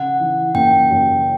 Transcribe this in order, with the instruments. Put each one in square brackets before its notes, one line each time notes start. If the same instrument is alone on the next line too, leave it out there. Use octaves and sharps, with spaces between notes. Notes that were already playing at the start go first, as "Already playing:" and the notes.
Already playing: [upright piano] C#3 [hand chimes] F#5
[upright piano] E3
[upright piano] F#1 [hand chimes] G5
[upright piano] F#2